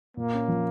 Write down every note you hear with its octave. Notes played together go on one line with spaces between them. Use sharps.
A#2 A#3
C#4
F3